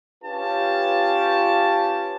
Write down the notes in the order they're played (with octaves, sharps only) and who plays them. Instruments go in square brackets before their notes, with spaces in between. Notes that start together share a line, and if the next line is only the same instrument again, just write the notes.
[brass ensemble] C#4 F4 G4 B4 A5